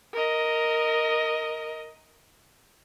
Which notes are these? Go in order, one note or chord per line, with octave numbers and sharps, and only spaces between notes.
A#4 D#5